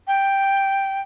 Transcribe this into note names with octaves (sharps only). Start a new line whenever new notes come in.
G5